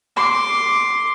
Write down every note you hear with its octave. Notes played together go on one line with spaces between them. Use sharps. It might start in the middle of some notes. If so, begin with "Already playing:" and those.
C6 D6